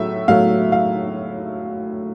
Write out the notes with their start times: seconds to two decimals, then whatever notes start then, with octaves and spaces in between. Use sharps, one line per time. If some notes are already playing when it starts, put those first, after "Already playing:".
Already playing: A2 F#3 A3 E5
0.28 A2 F#3 A3 F5
0.72 F5